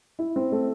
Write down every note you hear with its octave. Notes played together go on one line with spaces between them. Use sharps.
E4
C4
A3